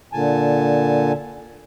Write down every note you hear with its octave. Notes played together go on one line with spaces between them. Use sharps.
A#2 D3 G#5 A5